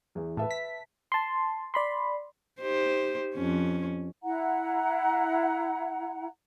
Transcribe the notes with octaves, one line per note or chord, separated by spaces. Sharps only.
E2 E3
A2 B4 E5 A5
B6
A5 C6
D5 B5 C6
D#4 G4 C5
F2 C#4
E4 F#5 A#5